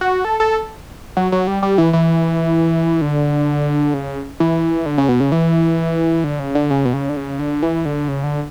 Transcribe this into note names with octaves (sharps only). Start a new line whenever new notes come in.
F#4
A4
A4
F#3
F#3
G3
G3
E3
E3
D3
C#3
E3
D3
C#3
B2
C#3
E3
D3
C#3
D3
C#3
B2
C#3
D3
C#3
D3
E3
D3
C#3
D3